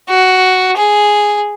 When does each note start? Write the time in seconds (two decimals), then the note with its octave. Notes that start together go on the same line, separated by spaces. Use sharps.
0.09 F#4
0.77 G#4